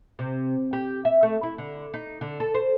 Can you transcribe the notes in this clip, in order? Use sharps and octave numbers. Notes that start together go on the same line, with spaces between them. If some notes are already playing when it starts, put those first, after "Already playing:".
C3
G4
E5
A3
E4
D3
D#4
D3
A4
C5